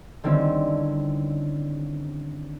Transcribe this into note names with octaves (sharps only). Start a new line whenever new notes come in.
D3 D#3 G3 C4 C#4 E4